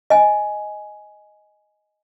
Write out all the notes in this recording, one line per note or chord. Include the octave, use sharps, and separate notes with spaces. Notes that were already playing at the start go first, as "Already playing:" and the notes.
D#5 G#5